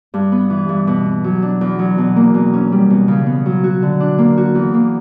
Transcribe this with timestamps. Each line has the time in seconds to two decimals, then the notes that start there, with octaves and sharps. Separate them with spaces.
0.14 G2
0.32 B3
0.50 E3
0.69 G2
0.87 B2
1.06 B3
1.24 F#3
1.42 D4
1.61 E2
1.79 F#3
1.98 B2
2.16 A#3
2.35 B2
2.53 C#4
2.72 G3
2.90 B2
3.08 C#3
3.27 B3
3.46 F#3
3.64 F#4
3.82 D3
4.00 D4
4.18 A#3
4.37 F#4
4.55 E2
4.74 A#3